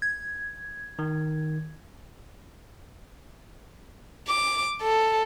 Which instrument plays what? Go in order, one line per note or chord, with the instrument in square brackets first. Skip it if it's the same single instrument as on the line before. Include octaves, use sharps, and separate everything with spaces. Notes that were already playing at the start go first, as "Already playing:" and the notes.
[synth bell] G#6
[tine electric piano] D#3
[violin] D6
A4